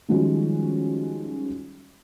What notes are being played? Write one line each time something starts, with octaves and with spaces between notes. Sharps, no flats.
D#3 F3 G3 G#3 C#4 F#4